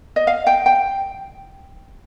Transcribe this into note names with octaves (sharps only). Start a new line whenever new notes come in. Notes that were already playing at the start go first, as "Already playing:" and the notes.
D#5
F5
G5
G5